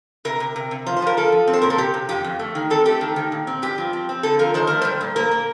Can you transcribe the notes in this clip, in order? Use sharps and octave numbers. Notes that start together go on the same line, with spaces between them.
C3 A#4
C3
C3
C3
F3 C5
C5
F3 A#4
F3 A4
F3
C4
C5
A#2 A#4
A4
C3 G4
C3
F2 G4
F2
A3
D#3
C4 A4
A3 G4
D#3
D#3
A#2
C4
G2 G4
F3
C4
C4
D3 A4
F3 A#4
D#3 C5
A3 A#4
G3 C5
A#2
A#3 A#4
A#3